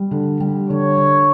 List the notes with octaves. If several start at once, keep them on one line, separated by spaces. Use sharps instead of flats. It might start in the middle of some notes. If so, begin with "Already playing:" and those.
Already playing: G3
D3
G3
D3 C#5
D3